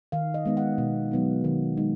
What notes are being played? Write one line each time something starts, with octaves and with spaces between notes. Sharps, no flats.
D#3 F5
D#5
G#3 B3 D#4
F#5
B2
F#3 B3 D#4
D#3
G#3 D#4